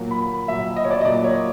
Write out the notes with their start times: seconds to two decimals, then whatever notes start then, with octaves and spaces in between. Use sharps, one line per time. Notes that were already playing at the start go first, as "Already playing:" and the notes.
Already playing: A#2 F#3 A#3
0.11 B5
0.48 A#2 F#3 A#3 E5
0.76 D#5
0.85 C#5
0.91 D5
1.01 D#5
1.05 A#2 F#3 A#3 D5
1.24 C#5